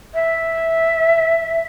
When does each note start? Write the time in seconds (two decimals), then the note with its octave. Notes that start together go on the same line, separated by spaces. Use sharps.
0.14 E5